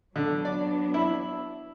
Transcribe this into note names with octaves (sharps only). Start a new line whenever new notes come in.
D3 F#3 B3 D4
D5
E4